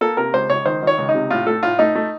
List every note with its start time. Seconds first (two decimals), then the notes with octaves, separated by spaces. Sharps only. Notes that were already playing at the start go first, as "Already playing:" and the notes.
0.01 A#3 A4
0.17 C3 A#4
0.33 C#2 C5
0.50 C#2 C#5
0.66 D#3 C5
0.82 D#3 C#5
0.98 C#2
1.09 D#4
1.14 C3
1.30 A2 F4
1.47 A3 A4
1.63 A2 F4
1.79 A3 D#4
1.95 A3